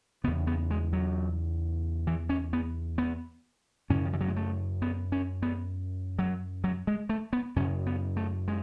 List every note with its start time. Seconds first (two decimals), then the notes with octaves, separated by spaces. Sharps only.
0.24 C#3 B3
0.27 E2
0.47 B3
0.71 G#3
0.93 F#3
2.07 E3
2.29 C#4
2.53 B3
2.98 B3
3.90 F#2 C#3 C#4
4.05 D#3
4.13 E3
4.21 F#3
4.28 G#3
4.36 A3
4.82 B3
5.12 C#4
5.42 B3
6.19 F#3
6.64 F#3
6.87 G#3
7.09 A3
7.33 B3
7.56 F#2 C#3 C#4
7.86 B3
8.17 A3
8.48 G#3